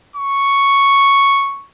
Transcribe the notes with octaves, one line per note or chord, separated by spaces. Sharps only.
C#6